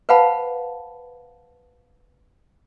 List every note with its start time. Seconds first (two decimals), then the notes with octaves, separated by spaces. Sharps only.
0.09 B4 C5 F5 F#5 A5 B5